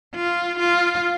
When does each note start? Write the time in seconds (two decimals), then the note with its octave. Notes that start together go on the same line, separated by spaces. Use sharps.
0.15 F4
0.59 F4